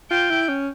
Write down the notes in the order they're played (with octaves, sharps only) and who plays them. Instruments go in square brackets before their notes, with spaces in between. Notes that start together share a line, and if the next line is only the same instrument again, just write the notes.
[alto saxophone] F4 [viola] G5
[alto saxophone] E4
C#4